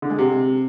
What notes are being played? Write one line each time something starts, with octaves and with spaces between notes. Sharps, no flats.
D3
G#3
C3